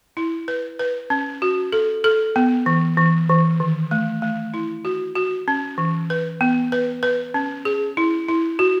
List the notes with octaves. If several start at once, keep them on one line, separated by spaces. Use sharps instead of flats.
E4
B4
B4
C#4
F#4
A4
A4
B3
E3
E3
E3
D#3
A3
A3
E4
F#4
F#4
C#4
E3
B4
B3
B4
B4
C#4
G#4
E4
E4
F#4